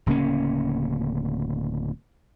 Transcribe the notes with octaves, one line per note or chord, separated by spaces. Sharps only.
D1 C#3 A#3 C#4